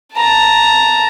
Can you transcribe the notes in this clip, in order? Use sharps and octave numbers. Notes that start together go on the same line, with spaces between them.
A5 A#5